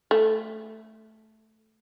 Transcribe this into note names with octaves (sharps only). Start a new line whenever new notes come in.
A3